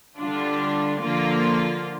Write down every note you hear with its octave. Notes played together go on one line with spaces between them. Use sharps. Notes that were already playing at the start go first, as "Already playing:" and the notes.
D3 G3 D4 F4
D3 F3 A#3 F4